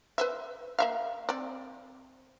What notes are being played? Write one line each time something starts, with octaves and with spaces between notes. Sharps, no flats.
B4 C5 E5
A#3 E5 F5
C4 D5